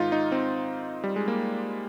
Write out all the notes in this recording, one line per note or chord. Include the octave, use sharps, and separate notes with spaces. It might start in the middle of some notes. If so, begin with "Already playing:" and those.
Already playing: G#2 D#3 D#4 F4
D#4
C4
G3
G#3
A#3